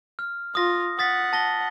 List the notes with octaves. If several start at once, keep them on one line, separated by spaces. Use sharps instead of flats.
F6
F4 D#6 A#6
F#5 D#6 A6 B6
A5 A#6 G7